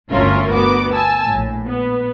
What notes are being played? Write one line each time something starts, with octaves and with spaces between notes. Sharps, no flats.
G1 D2 C#4 F4 A#4 E5
D2 B3 F#4 D6
G#5 A5 E6
A#1 A2
B3